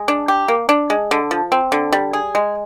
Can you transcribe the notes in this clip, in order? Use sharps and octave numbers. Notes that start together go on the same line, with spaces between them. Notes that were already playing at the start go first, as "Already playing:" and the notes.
Already playing: G#3
D4
G4
A#3
D4
G#3
D3
F3
C4
D3
G3
G#4
G#3